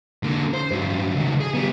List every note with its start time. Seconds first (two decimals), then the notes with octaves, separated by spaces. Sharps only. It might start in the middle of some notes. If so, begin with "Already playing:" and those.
0.23 D3 A#3
0.54 C5
0.72 G2 F#3
1.16 C#2 D#3
1.41 G#4
1.54 G3 B3